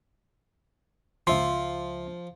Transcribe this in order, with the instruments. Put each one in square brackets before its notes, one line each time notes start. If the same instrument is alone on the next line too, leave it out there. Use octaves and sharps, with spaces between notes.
[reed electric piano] C#2 E5 C6 [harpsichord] F3